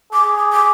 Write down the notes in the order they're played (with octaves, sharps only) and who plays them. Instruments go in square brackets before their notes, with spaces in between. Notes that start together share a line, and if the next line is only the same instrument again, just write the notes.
[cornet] G#4 [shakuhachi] D6
[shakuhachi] D6
D6